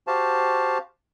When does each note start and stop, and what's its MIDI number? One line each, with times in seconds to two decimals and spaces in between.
0.07 0.78 66
0.07 0.78 67
0.07 0.78 72
0.07 0.78 77
0.07 0.78 81